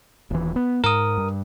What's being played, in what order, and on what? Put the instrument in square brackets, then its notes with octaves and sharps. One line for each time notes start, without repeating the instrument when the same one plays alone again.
[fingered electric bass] D#1 E3
B3
[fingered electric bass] G#2 [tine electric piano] A#4 D#6
[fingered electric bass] G2